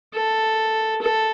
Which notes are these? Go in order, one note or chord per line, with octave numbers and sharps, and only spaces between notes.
A4
A4